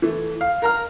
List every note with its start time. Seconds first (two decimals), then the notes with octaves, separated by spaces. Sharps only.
0.02 E3 A3
0.41 F5
0.62 A#4 A#5 F6